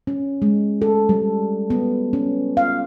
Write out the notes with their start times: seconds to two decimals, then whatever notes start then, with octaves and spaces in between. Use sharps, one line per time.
0.07 C#4
0.42 G#3
0.82 A4
1.09 G3
1.70 B3
2.13 C#4
2.57 F5